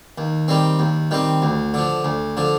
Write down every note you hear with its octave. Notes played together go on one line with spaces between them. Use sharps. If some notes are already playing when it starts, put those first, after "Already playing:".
D#2
D#3 G3 C4
D#2
D#3 G3 C4
D2
D3 F3
D2
D3 F3